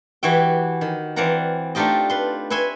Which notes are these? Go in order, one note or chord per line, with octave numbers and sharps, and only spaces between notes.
E3 F#4 G4 C#5 E5 G5
D#3
E3 C4 D5 F5 F#5 A#5
A3 D4 D#4 F4 G4 D#5
B4 C6
B4 C#5 E5 G#5 C6